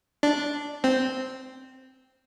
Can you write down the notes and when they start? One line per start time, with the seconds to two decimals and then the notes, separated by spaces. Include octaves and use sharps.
0.23 D4
0.84 C4